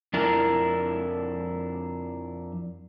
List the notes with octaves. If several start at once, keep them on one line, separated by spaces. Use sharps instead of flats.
F2 D4 E4 A#4